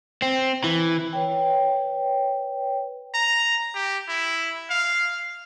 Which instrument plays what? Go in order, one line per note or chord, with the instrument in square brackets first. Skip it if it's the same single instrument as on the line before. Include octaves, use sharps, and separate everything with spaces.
[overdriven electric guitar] C4
E3
[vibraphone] B4 C#5 G5
[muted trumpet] A#5
G4
E4
F5